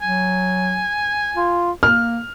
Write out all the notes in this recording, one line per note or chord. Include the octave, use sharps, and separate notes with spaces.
F#3 G#5
F4
A#3 F6